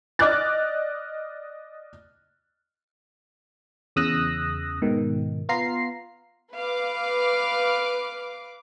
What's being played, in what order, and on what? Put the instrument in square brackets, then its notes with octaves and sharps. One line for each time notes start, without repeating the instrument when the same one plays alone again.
[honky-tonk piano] D5 D#5 D6 F6 F#6 A6
[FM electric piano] E2 C#3 D#6 E6 F#6 A#6
G#2 B2 D#3
B3 F4 A#5 C7
[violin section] B4 F5 D6